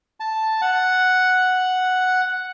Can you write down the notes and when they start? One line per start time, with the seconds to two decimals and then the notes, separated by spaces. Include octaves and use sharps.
0.20 A5
0.62 F#5